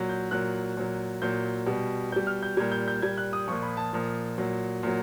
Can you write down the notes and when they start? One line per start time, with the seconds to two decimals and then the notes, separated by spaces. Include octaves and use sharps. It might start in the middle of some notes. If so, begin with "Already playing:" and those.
Already playing: A#2 F#3
0.09 G6
0.31 A#2 F#3 F#6
0.77 A#2 F#3
1.22 A#2 F#3 G6
1.66 B2 G3
2.12 B2 G3 G6
2.27 F6
2.43 G6
2.57 A#2 G3 G#6
2.72 G6
2.88 G6
3.02 A#2 G3 G#6
3.18 F#6
3.33 D#6
3.47 A#2 F3 C#6
3.62 B5
3.77 A5
3.93 A#2 F3
4.38 A#2 F#3
4.83 A#2 F#3